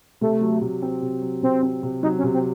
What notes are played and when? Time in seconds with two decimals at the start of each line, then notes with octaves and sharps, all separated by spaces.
0.21 C3 A3
0.41 F#3
0.61 C3
0.82 C4
1.02 C3
1.22 F#3
1.42 C3 C4
1.63 C4
1.83 C3
2.03 F#3 D#4
2.19 C#4
2.23 C3
2.34 C4